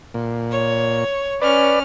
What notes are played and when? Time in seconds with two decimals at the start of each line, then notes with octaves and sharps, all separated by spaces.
0.14 A#2
0.51 C#5
1.41 C#4 B4 D5 F6